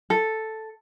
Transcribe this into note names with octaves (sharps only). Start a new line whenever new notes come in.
A4